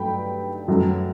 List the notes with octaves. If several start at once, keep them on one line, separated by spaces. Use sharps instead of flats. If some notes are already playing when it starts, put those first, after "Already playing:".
Already playing: G2 F#3 A3 G5 B5
F#2 F#3 A3